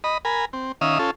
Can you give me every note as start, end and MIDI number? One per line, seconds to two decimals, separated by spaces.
0.04 0.18 75
0.04 0.18 83
0.25 0.45 70
0.25 0.45 80
0.25 0.45 83
0.53 0.72 60
0.81 0.98 51
0.81 0.98 61
0.81 0.98 76
0.81 0.98 77
0.81 0.98 87
0.99 1.11 61
0.99 1.11 65
0.99 1.11 69